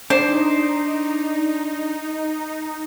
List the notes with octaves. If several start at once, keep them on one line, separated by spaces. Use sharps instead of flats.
D4 D#4 C5